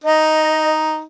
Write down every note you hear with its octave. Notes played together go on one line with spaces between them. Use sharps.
D#4 D#5